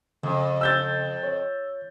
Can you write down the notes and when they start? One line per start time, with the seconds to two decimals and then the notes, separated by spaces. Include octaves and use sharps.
0.23 F2 C#3
0.61 E6 G6 A6
1.23 C#5